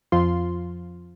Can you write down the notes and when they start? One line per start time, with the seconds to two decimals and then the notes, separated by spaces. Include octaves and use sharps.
0.12 F2 F3 F4 C6